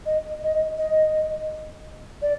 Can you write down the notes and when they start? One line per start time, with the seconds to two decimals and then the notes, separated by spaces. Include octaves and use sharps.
0.06 D#5
0.42 D#5
0.78 D#5
2.21 D5